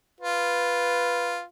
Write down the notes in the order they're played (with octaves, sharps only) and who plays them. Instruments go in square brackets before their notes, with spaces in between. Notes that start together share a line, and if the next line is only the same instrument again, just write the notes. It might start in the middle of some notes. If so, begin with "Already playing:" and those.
[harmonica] F4 [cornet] B4